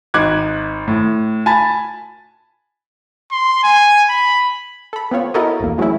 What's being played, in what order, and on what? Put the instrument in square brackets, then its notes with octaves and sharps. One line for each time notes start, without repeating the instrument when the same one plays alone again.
[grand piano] G#1 D#4 D6 F#6 G#6
A2
G#5 A5 B5 A6
[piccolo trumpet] C6
G#5
B5
[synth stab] A4 B5
B3 C4 F4 C#5
E4 F#4 A4 A#4 C#5 D#5
A#1 E2 A#3
E3 F#3 G#3 A3 C#4 E4